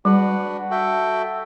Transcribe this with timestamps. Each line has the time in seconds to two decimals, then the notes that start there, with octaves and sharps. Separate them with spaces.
0.05 G3 D4 F#4 B4 F#5
0.70 F#4 A4 E5 G5